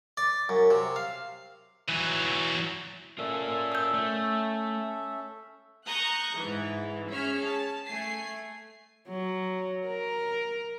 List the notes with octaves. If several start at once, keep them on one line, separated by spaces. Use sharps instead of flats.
D5
F#2
C3
F5
E3 F#3
C#4 F4 A4 A#4 D5 E5
E6 G6
A3
A#5 C#6 D#6 F#6 G6
G#2 E3
C#4 G#4 E5 F6
A5
A3 G#5 C7
F#3
A#4